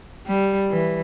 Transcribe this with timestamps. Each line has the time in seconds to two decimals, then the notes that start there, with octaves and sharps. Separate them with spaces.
0.27 G3
0.70 E3